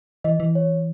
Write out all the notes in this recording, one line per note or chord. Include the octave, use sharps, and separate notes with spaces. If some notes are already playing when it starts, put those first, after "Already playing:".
E3 D#5
E3
C#5